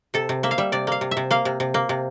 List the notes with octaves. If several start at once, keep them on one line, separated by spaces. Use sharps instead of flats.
C3 A4
C3
A#3 E5
F5
G3 E5
C3 D5
A#3 F5
C3
E5
C3
A#3 F5
C3
C3
A#3
C3